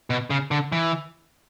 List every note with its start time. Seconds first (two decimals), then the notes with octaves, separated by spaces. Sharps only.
0.10 B2
0.30 C#3
0.51 D3
0.72 E3